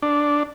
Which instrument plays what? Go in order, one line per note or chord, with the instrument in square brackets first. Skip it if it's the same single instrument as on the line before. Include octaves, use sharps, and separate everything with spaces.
[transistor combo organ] D4